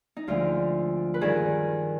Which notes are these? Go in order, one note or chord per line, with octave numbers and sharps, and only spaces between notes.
D#4
D2 D3 F3 G#3 F4
B4
G2 D#3 G3 G#4